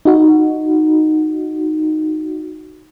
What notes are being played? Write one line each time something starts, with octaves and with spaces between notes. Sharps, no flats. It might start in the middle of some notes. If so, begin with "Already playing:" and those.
D#4 F#4